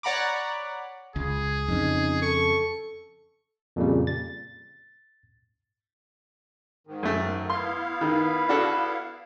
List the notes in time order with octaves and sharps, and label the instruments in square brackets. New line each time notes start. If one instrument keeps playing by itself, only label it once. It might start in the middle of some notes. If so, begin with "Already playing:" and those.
[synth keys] C#5 D5 F#5 A#5 B5 D6
[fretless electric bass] C#2 [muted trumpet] G#4
[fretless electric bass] F2 C#3 [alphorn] D#4
[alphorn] A4 [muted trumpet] C#6
[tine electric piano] F2 A#2 C#3 G3
A6
[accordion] G#2 D#3
[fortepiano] F#2 A3
[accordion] B3 E4 F5 [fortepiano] C6
[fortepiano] D#3 [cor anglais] B4
[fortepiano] D4 F#4 A4